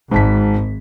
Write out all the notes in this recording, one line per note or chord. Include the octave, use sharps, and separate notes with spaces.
G#1 G#2 A5 B6